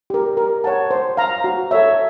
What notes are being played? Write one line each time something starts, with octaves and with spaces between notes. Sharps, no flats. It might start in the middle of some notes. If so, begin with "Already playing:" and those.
G4 A#4
A#4
C#5 F#5 A5
C5
F5 A#5
F#4
A4 C#5 E5